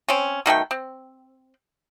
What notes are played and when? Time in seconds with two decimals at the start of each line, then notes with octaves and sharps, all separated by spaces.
0.09 C4 C#4
0.46 B2 D#3 A3 G5
0.71 C4